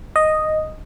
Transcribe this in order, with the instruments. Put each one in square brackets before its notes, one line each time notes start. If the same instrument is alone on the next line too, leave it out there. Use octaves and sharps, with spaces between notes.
[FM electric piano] D#5